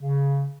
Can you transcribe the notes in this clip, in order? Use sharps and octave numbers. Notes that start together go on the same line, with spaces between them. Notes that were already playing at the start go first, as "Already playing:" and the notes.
C#3